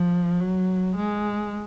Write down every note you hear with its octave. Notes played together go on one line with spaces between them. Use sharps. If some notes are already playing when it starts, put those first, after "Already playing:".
Already playing: F3
F#3
G#3